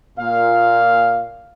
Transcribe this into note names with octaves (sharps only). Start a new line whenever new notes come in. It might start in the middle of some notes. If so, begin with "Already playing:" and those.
A#2 F5